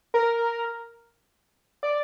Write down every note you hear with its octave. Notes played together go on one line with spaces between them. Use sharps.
A#4
D5